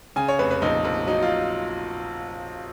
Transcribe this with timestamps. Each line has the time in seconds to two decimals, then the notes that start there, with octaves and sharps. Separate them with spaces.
0.16 C#3 G#5
0.28 C#5
0.39 F1 B4
0.51 B4
0.62 A#1 D#4
0.85 A#1
1.07 F#3 D#4
1.22 F4